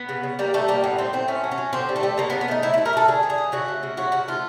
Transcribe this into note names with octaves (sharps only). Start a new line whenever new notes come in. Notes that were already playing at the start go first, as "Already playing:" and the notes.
Already playing: B3
C#3
C#3
G3 A#3
G3 A3
G3 A#3
A2 B3
A2 C4
A2 C4
A3 C#4
F#3
C#4
F#3
D3 C4
G3
A3
G3
C#3 A#3
B3
C#3
B3
A3 D#4
A3 E4
E4
A3
A#4
A3 A4
D3 G#4
D3
G#4
A3
C#3 F#4
A3
C#3
F#3 F#4
C#3 F#4
A3 F4